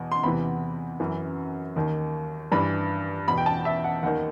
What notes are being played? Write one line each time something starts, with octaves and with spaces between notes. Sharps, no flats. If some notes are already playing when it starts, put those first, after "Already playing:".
Already playing: E2 B2
C6
E2 C3 E3 B5
F#2 E3
D#2 D#3
G2 E3 B5
E2 B2 B5
G5
A5
E5
F#5
D#2 D#3 F#5